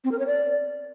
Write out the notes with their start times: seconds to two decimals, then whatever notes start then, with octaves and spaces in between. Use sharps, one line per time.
0.04 C4
0.12 A#4
0.19 C#5
0.26 D5